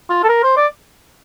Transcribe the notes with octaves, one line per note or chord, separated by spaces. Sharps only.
F4
A4
A#4
C5
D5